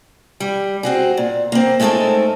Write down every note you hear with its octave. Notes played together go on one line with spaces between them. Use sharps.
G3
C4 F#4 G#4
A#2
A#3 C4
G#3 A3 C4 D#4 A4 A#4